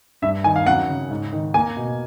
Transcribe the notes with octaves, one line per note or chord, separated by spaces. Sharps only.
G2 E5
D#3 G#5
F5
F#2 F#5
C#3
G#2
D#3
A#3 G#5
B2